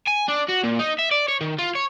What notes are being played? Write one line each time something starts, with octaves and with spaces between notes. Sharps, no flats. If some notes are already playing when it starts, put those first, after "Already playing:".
G#5
D4
F#4
A#2
D#4
E5
D5
C#5
D#3
F4
C#5